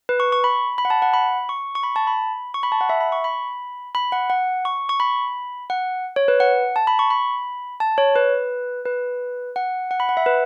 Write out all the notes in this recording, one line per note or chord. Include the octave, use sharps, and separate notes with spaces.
B4
C#6
C#6
B5
B5
F#5
A5
F#5
B5
C#6
C#6
B5
A5
B5
C#6
B5
A5
F#5
E5
B5
C#6
B5
B5
F#5
F#5
C#6
C#6
B5
F#5
C#5
B4
F#5
A5
B5
C#6
B5
A5
C#5
B4
B4
F#5
F#5
B5
F#5
E5
B4